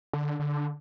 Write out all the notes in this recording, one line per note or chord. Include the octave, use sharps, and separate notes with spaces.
D3
D3